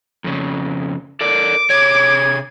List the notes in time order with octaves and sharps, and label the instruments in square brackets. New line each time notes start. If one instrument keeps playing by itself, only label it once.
[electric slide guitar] F2 C#3
[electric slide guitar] A4 A#4 D5 [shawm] D6
[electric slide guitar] C3 G#4 C#5 [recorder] G#6